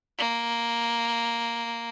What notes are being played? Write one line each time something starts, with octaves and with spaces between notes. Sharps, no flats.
A#3